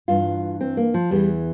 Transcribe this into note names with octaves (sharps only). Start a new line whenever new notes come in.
G2 E3 F4
C4
A#3
F3
E2 E3 G3